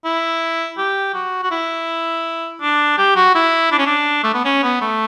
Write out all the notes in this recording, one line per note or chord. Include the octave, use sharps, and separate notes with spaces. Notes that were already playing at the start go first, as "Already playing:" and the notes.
E4
G4
F#4
F#4
E4
D4
G4
F#4
E4
D4
C#4
D4
A3
B3
C#4
B3
A3